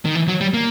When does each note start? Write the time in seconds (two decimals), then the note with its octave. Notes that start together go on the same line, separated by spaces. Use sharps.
0.05 D#3
0.15 E3
0.28 F#3
0.41 G3
0.54 A#3